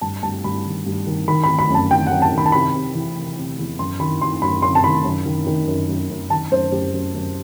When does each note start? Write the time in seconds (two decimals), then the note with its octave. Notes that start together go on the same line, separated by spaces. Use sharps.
0.01 G2 A5
0.23 G2 A5
0.44 G2 B5
0.66 D#3
0.86 G2
1.07 D#3
1.28 D#3 B5
1.43 D#3 B5
1.59 B5
1.70 F#2 A5
1.91 D#3 G5
2.06 F#2 F#5
2.22 A5
2.33 D#3 B5
2.46 A5
2.52 C3 B5
2.74 C3
2.95 E3
3.17 C3
3.37 C3
3.59 E2
3.79 F#2 C6
4.00 D#3 B5
4.21 D#3 C6
4.42 F#2 B5
4.62 F#2 C6
4.75 A5
4.84 D#3 B5
5.04 F#2
5.26 D#3
5.47 D#3
5.67 F#2
5.89 F#2
6.10 F#2
6.30 D#3 A5
6.52 F#2 C5
6.72 F#2 G4
6.94 F#2
7.14 F#2